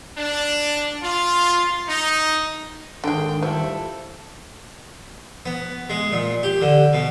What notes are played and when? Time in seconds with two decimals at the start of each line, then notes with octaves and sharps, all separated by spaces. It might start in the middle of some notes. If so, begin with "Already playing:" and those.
0.18 D4
1.03 F4
1.88 D#4
3.04 G#2 D3 D#3 G#3 G5
3.42 F3 G3 A3 E4 A4
5.46 B3
5.90 G#3
6.12 A#2
6.43 G4
6.61 D3
6.93 B2